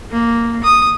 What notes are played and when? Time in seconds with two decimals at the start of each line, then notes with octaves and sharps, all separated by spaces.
0.11 A#3
0.64 D#6